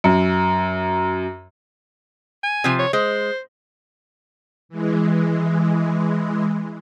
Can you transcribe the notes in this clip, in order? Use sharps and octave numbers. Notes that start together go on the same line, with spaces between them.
F#2
G#5
C3 F3
C#5
G#3 C5
E3 G#3